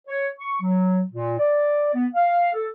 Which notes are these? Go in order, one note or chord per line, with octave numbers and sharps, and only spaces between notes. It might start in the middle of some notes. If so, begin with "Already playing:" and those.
C#5
C#6
F#3
A#2
D5
B3
F5
A4